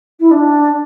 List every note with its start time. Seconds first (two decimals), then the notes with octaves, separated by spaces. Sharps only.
0.19 E4
0.31 D4